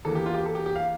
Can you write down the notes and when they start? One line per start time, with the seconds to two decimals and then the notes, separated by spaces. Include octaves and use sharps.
0.05 E2 E3 A#3 A4
0.15 G4
0.26 F4
0.35 G4
0.46 A4
0.55 G4
0.66 G4
0.75 F5